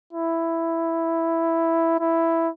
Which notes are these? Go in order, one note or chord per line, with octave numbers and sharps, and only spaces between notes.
E4
E4